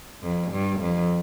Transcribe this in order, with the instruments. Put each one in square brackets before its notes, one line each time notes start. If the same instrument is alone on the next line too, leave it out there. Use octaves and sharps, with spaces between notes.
[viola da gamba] F2
G2
F2